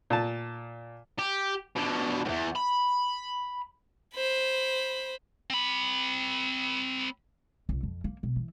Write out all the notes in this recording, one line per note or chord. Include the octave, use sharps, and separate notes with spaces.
A#2 A5
G4
B2 D3
E2 G#2
B5
C5 B5
C4 B5
C2
F2
A#3
B2
E3